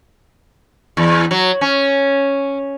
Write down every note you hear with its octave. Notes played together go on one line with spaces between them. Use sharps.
E2
F#3
C#4